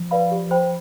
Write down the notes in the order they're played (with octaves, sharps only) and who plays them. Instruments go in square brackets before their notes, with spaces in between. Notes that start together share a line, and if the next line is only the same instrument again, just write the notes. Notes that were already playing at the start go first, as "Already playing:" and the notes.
Already playing: [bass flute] F3
[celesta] B4 D5 F5 B5
G4
C5 G5 B5